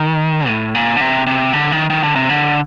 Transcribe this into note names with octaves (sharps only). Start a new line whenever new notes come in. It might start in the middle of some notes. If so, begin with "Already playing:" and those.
Already playing: D#3
A2
A#2
D3
C3
C3
D3
D#3
D#3
D3
C3
D3